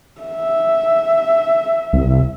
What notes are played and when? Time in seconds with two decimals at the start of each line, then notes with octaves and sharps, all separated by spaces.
0.21 E5
1.93 C2